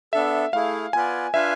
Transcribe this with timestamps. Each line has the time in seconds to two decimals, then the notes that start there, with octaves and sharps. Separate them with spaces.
0.13 B3 D4 A4 E5
0.53 A3 E4 G#4 F5
0.93 B3 F4 B4 D5 G#5
1.34 D4 F4 B4 E5 F5 G#5